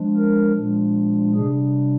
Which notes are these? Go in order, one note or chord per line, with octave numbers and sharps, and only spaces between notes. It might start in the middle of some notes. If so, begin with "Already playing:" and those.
Already playing: F3 G#3 D4
A#4
A#2 F3 G#3 D4
C3 G3 D4 G#4